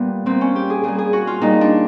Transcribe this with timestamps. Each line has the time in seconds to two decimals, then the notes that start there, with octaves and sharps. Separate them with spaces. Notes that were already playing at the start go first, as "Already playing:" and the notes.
Already playing: A#2 G3 B3
0.26 A#2 G3 C4
0.41 C#4
0.56 G4
0.70 G#4
0.84 A#2 G3 G#4
0.98 G#4
1.13 F#4
1.27 F4
1.41 A#2 G3 D#4
1.61 D4